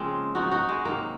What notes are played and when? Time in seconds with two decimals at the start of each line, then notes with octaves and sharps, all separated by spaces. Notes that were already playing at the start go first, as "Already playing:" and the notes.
Already playing: C#3 F3 G#3 A#3 C4
0.35 C#3 F3 D#4 F#4
0.51 D#4 F#4
0.69 G#3
0.85 C3 D#3 F#3 A#3